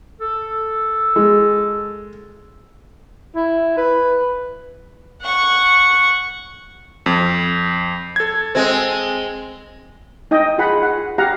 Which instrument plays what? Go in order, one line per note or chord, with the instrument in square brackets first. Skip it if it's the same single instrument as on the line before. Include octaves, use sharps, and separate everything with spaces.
[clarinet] A4
[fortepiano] G#3
[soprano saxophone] E4
B4
[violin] F#5 C#6
[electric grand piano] F2
A4 G#6
[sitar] G#3 C4
[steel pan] D#4 D#5 G5
F4 G#4 F#5 B5
F#5
G4 F5 F#5 A#5